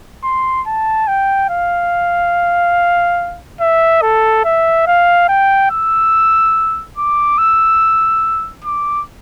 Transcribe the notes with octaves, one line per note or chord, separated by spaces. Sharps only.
C6
A5
G5
F5
E5
A4
E5
F5
G5
E6
D6
E6
D6